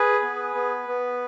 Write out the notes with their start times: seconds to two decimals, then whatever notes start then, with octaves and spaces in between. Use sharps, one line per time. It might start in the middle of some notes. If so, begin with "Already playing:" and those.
Already playing: G#4 B4
0.23 B3
0.55 B3
0.88 B3